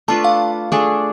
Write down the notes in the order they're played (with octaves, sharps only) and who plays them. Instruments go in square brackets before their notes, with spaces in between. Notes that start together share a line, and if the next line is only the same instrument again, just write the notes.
[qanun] A3 D4 F4 B4 [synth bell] A5
[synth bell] F5
[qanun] A3 D4 G#4 D5